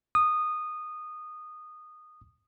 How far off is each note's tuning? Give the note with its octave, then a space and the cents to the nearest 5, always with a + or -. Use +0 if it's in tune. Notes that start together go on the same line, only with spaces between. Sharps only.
D#6 -15